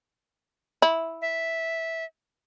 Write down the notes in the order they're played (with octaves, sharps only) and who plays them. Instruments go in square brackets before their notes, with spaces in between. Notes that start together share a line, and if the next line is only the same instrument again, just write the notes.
[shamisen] E4
[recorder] E5